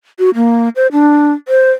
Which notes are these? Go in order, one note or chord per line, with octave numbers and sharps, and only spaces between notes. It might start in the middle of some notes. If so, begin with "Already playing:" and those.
F#4
A#3
C5
D4
C5